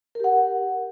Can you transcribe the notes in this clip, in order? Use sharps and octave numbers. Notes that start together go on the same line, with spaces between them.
G4 A#4 F#5